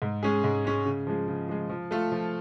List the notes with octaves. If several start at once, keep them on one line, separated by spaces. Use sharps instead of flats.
G#2
G#3 C#4 G#4
G#2
G#3 C#4 G#4
C#3
F3 G#3
C#3
F3 G#3
F3
A3 F4 A4
F3